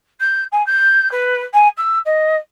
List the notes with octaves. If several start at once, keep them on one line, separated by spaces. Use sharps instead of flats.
G6
G#5
G6
B4
G#5
E6
D#5